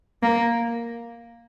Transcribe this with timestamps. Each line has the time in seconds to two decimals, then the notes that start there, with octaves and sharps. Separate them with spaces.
0.23 A#3